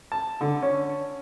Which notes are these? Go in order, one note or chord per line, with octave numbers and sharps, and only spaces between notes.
A5
D3
C#4